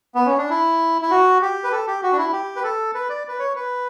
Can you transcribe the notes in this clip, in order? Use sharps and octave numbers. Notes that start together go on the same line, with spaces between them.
B3
C#4
D4
E4
E4
F#4
G4
B4
A4
G4
F#4
D4
E4
G4
B4
A4
B4
D5
B4
C#5
B4